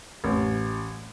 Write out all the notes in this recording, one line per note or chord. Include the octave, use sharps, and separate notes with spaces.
A1